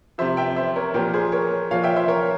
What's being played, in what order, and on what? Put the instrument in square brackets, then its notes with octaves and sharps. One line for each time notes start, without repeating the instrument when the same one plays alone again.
[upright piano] C3 F3 C5 E5
E5 G5
C5 E5
A#4 C#5
A#2 F3 G4 A#4
G#4 C5
A#4 C#5
A#2 F3 C#5 F5
E5 G5
C5 E5
A#4 C#5